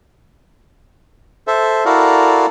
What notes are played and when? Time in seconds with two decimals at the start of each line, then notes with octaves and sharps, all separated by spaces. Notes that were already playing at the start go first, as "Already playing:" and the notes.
1.47 A4 C5 E5
1.85 E4 F#4 A4 A#4 D5 F5